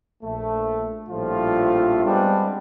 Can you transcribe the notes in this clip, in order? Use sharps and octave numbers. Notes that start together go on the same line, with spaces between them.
A#1 A3
A#1 A2 F3 G3 A3 F4
G3 G#3 B3 C4 D4